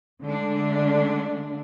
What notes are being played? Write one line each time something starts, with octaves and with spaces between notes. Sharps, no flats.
D3 G#3 A3 D4